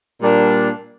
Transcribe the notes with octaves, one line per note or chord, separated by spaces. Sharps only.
A#2 G3 A#3 D4